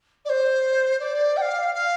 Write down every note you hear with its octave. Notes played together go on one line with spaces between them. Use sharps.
D5
C5
D5
G5
F5
F5